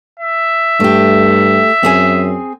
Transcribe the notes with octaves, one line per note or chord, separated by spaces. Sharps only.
E5
G2 A3 G4
F#2 C4 G#4 G#5